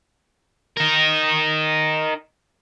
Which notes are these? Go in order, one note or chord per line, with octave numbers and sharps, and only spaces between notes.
D#4 A#4